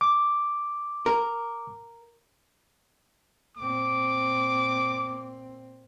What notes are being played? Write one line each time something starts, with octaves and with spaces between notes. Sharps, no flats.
D6
A#4
A#2 C4 D6